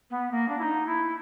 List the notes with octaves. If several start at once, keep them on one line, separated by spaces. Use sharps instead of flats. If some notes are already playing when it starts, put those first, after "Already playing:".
B3
A#3
D4
E4
D#4
E4